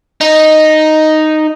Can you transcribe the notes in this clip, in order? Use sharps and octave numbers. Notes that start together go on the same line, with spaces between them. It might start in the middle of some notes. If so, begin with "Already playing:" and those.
D#4